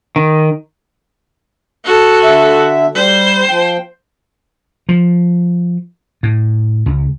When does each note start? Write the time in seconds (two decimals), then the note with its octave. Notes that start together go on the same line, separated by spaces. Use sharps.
0.16 D#3
1.85 F#4 A4
2.24 D3 E5
2.95 G3 C5
3.49 F3 G5
4.89 F3
6.23 A2
6.86 C#2